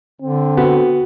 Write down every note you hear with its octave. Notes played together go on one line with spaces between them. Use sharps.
D3 C4
B3 F#4